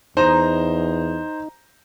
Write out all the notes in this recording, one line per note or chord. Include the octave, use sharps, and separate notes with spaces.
E2 D#4 C5 A#5